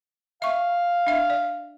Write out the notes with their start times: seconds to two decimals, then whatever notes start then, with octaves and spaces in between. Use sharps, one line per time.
0.42 E5 F5 C#6
1.07 D4 E5
1.30 D5